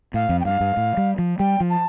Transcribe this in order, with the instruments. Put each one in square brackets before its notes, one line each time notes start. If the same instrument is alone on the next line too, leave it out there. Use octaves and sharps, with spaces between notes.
[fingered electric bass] A2 [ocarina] F5
[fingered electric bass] F2
[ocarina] G5
[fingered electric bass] G2 [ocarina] F5
[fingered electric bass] G2
A2
G3
F3
[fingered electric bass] G3 [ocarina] G5
[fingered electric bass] F3
[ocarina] A5